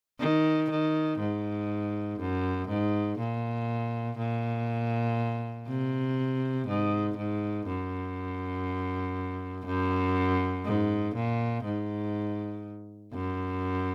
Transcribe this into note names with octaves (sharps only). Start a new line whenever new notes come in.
D#3
D#3
G#2
F#2
G#2
A#2
A#2
C3
G#2
G#2
F#2
F#2
G#2
A#2
G#2
F#2